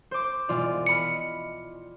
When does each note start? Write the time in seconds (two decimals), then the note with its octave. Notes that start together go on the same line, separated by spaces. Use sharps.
0.11 C5 D6
0.48 E1 F4 D5
0.86 D#5 B5 F6 C#7